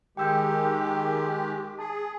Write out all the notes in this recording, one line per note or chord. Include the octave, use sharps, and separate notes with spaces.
D#3 G#3 G4 G5 E6 G6
G#4 A5